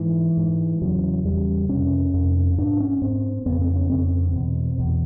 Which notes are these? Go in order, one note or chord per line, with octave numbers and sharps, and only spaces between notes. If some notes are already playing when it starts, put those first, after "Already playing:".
Already playing: G#2 E3
G#2
E2 C#3 F#3
E2 C#3 G3
F2 C3 C#4
F2 C3
G#2 D4
C#4
G#2 C4
F2 C#3 B3
C4
C#4
F2 C#3 C4
E2 B2
E2 B2